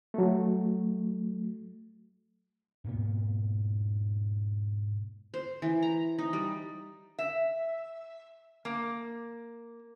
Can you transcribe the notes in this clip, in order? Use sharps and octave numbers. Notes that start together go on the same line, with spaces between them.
F#3 A3
G#2 B2 A#3 B3
C5
E3
A#5
D#4
G3
E5
A#3